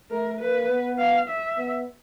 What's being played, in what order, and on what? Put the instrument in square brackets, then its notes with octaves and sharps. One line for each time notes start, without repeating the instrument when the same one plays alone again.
[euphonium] A3 [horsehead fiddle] A#4
[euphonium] A#3 [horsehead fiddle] B4
[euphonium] B3
[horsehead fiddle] F5
E5
[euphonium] B3